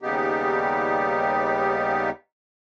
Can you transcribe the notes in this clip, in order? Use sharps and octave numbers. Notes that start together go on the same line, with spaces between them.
D#2 C#3 G3 B3 D#4 G4